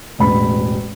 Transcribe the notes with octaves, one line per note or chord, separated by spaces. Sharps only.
E1 A1 B5